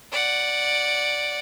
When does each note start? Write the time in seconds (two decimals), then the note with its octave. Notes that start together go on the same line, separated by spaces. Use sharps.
0.13 D5 F#5